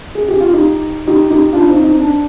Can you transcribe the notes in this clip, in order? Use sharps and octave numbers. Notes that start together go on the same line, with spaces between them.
G#4
G4
F4
D#4 G4
D#4 G4
D#4 G4
D4 F4
C4 D#4
C4 D#4
D4